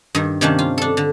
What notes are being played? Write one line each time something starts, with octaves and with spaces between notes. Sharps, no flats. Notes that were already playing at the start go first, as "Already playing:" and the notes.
G2 D#3
C3 D#3 G3 A#3 C#4 D4
F4
D4 A4
D3